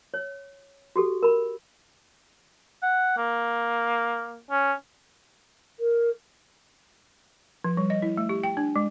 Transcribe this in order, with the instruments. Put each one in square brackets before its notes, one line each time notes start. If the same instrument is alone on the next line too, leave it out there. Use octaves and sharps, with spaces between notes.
[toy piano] C#5
F#4 G4 A4
A#4 B5
[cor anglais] F#5
A#3
C#4
[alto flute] A#4
[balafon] F3
G3
D#5
E4
A3
G4
G5
D4
G#3